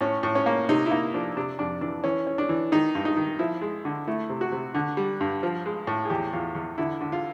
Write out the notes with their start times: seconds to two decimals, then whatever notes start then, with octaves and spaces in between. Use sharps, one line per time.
0.01 A2 C#4
0.23 A2
0.35 C#4
0.46 A#3
0.69 C3 D#4
0.86 E4
0.91 A#3 D#4
1.14 F3 D4
1.37 C3 D4
1.59 F2 D4
1.81 E3 D4
2.04 E3 C#4
2.27 C#4
2.38 D4
2.49 E3
2.72 D#3 D#4
2.95 G2
3.05 D#4
3.17 D#3
3.39 F3 E4
3.61 G#3
3.85 D3
4.07 A3 E4
4.29 C3
4.41 F#4
4.52 C3
4.74 D3
4.97 G3
5.21 G2
5.43 F3
5.66 G#3
5.87 A2
6.05 G#4
6.10 E2 G4
6.33 E2 F4
6.55 E2
6.78 D3 E4
7.01 D3
7.12 F4